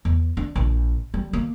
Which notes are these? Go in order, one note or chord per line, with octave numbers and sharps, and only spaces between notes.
E2
D4
A#1
G3
A#3